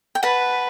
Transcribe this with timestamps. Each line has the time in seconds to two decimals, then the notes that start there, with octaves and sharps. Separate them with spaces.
0.15 G5
0.23 B4 F#5 A5